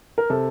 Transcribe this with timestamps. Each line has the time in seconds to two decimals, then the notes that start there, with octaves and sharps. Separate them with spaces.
0.18 A#4
0.30 C3 A4